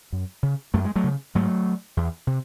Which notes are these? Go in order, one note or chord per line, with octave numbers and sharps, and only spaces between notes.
F#2
C#3
F#2 A3
G#3
F#3 A3
C#3
G#2 F#3 A3
E2
C3